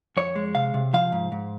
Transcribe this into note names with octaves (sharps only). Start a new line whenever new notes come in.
F2 C#5
G#3
C3 F5
C3
F3 F5
G#2
G#2